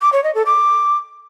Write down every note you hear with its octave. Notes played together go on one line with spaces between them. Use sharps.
D6
C#5
D#5
A4
D6